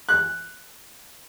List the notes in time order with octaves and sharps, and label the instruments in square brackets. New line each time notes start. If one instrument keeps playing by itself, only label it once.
[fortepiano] F#6